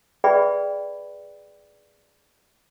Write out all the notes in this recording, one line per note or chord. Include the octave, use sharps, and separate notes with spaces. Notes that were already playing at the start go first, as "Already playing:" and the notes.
G#4 B4 D5 E5 G5 B5